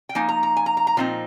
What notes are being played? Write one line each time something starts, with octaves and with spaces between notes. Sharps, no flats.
G5
F3 A#3 D#4 G#5
A#5
A#5
G#5
A#5
A#5
A#5
A#2 F3 C4 D#4